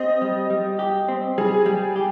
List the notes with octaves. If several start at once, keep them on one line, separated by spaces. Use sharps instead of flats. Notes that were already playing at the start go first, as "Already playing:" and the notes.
Already playing: C4 G4 D#5
G3
G3
G4
C4
G3 G#4
G3
G4